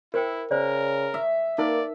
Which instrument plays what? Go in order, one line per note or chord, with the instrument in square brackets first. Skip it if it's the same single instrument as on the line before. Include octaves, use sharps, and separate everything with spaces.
[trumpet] E4 [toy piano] A#4 C5 G5
[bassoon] C#3 [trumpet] A#4 [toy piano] C5 D5
[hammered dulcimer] E5
[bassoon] A#3 [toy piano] D#4 A#4 B4 [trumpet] D5